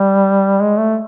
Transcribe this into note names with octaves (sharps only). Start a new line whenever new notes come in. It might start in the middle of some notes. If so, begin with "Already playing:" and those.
Already playing: G3
G#3
A3